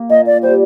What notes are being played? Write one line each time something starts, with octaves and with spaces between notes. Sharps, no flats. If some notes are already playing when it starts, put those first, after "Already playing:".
Already playing: A#3
A#2 D#5
D5
G3 C5